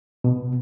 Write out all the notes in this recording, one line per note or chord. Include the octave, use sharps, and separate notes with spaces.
B2